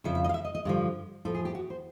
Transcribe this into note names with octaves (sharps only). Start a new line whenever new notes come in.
F2 C#3 F3 E5
E5
D#5
F5
E5
D#5
D#5
G2 D3 F3
A2 F3 A4
G#4
G4
F#4
C5